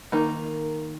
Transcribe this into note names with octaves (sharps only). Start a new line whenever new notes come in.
D#3 A#3